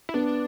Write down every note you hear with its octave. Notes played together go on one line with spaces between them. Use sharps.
E4
B3 D4